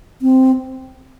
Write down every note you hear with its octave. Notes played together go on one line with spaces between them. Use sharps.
C4